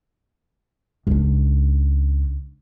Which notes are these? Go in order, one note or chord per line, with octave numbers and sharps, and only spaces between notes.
C#2 D4